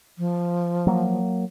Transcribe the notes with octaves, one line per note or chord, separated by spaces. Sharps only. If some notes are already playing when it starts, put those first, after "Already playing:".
F3
F#3 A#3